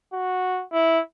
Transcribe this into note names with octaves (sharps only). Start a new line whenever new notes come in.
F#4
E4